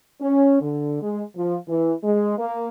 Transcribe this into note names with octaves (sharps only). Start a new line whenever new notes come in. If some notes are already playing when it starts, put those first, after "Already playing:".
C#4
D3
G#3
F3
E3
G#3
A#3